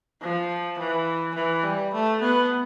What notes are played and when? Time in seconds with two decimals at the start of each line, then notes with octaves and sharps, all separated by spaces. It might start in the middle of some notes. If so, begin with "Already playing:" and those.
0.21 F3
0.79 E3
1.35 E3
1.63 G3
1.93 A3
2.21 B3